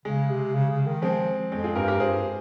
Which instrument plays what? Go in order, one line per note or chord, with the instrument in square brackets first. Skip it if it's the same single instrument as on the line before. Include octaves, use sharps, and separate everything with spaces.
[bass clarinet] C#3 [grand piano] G#3
[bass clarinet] C3
C#3
C#3
D#3
[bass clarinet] F3 [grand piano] G#3 C4
[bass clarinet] F2 [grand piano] G#3 C4
[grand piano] F4 G#4
[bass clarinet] G2 [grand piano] G4 A#4
[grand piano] G4 A#4
[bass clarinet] G2 [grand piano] G#4 C5